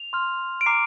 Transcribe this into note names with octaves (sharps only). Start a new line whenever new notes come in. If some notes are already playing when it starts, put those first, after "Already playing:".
Already playing: F7
C6 F6
D7
A#5 D6 F6 C7